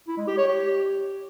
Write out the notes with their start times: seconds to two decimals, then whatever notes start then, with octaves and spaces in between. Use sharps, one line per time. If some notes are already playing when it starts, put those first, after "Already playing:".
0.08 E4
0.18 G#3
0.28 G4
0.37 C#5
0.47 G4